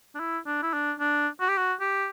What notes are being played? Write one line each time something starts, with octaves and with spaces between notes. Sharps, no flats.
D4
E4
D4
E4
D4
D4
F#4
G4
F#4
G4